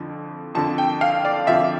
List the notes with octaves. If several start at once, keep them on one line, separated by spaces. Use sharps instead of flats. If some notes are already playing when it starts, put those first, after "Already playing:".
Already playing: F2 D3 F3
F2 D3 F3 A5
G5
F5
D5
F2 D3 F3 E5